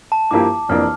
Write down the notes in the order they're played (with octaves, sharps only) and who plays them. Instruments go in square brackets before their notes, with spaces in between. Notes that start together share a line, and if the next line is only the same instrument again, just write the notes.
[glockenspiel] A5
[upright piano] G2 F3 A#3 E4 G4 [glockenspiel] D6
[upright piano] F1 F2 E3 A#3 D4 [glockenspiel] F6